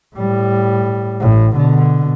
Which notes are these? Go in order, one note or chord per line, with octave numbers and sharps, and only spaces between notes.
A2 G3
A1 A2
B2 D3